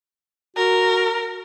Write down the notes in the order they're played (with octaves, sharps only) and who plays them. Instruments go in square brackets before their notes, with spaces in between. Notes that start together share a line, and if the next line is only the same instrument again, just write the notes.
[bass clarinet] F#4 [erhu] A#4